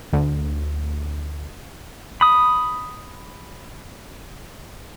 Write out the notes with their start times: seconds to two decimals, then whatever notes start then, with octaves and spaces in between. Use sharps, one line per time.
0.13 D2
2.21 B5 D#6